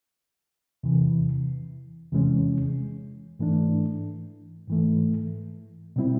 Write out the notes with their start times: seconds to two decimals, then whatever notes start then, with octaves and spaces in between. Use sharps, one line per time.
0.83 E2 C3 E3
2.12 E2 C3 E3 G#3 C#4
3.39 G#2 E3 A3 D4
4.68 G#2 E3 A3
5.96 B2 G3 C4 E4